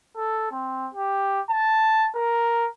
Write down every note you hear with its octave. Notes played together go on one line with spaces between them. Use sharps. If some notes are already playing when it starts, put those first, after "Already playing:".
A4
C4
G4
A5
A#4